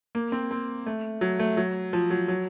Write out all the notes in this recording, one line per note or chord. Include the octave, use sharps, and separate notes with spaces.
A#3
C4
C4
A3
F#3
A3
F#3
F3
F#3
F#3